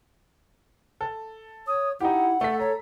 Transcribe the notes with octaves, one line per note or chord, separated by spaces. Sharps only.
A4
C#5 D#6
D#4 E4 G4 F#5
A3 A4 B6
C#5 A#5